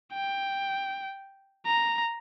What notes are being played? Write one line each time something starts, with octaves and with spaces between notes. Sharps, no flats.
G5
A#5